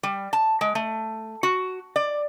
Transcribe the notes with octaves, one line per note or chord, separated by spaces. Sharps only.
G3
A5
G#3
A3
F#4
D5